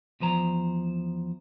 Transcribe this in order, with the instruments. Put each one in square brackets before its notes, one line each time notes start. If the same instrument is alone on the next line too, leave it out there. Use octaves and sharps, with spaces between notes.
[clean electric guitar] E2 F3 C5 A#5